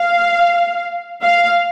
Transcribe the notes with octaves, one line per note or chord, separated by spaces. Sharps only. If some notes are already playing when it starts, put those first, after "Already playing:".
Already playing: F5
F5